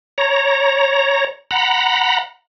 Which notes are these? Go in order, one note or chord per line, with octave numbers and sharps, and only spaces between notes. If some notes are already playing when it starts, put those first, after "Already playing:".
C#5 A#5
F#5 A#5 B5